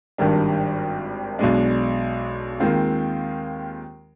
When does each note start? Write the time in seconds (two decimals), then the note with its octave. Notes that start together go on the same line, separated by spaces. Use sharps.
0.18 G#1 G2 D#3 G3 D4
1.39 B1 B2 G#3 D4
2.60 D#2 D#3 G#3 C4 F4